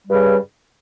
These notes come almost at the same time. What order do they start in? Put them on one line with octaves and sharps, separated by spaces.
G3 G2 C#3